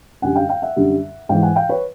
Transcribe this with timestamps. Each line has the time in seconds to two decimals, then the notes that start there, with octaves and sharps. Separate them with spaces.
0.22 F#2 D3 G3 F#5 G#5
0.35 F5 G5
0.49 F5 G5
0.62 E5 F#5
0.76 F#2 D3 G3
1.29 G#2 E3 G#3 F5 G5
1.42 F#5 G#5
1.56 F5 G5
1.69 B4 C#5